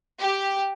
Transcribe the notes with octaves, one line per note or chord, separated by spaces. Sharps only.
G4